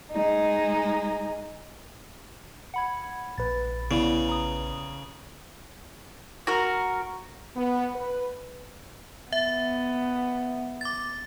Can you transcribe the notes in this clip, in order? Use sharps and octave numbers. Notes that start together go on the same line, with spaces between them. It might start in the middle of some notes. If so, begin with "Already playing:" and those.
G#3 D#4
F#5 B5 G#6
A#1 B4 A6
C#3 B3 E4 D5
A#5 D#6
F#4 A#4
B3
B4
B3 E5
D6 A6